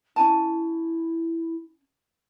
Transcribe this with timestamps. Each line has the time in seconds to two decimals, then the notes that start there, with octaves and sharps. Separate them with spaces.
0.16 C#4 E4 G#5 A5